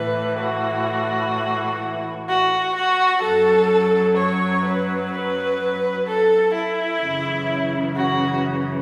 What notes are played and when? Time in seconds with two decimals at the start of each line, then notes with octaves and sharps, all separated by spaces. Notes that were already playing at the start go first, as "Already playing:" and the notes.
Already playing: A2 E3 B4
0.39 F#4
2.28 F#4
2.76 F#4
3.22 F#2 F#3 A4
4.18 C#5
4.65 B4
5.13 B4
6.07 A4
6.54 E4
7.01 F#2 C#3 E3
7.96 F#4